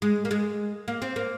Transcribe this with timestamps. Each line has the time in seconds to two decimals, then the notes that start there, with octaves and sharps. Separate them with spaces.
0.02 G#3
0.25 A#3
0.31 G#3
0.88 A#3
1.02 C4
1.16 A#3